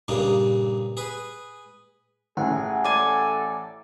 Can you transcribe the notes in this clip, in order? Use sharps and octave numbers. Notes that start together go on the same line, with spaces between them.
G2 A#2 C#3 A#3 D#4
G#4 B4
A1 G#4 F#5
A4 D5 G#5 C6